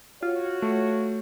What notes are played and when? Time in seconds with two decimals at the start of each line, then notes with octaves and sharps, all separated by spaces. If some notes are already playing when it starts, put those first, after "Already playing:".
0.23 F4 F#4 C#5
0.62 A3